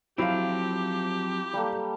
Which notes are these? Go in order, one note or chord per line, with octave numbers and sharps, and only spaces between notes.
F3 F#3 C4 E4 G4 F5
G3 A#3 A4